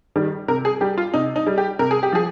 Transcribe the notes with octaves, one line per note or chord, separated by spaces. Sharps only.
D#3 G3
C3 A#4
G#4
G3 G4
F4
C3 D#4
D#4
G3
G4
C3 A#4
G#4
G4
F3 G#4